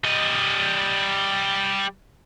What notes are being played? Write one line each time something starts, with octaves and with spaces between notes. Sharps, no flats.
G3 D#5